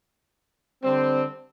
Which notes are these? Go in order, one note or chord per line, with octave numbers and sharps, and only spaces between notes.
D3 G3 C4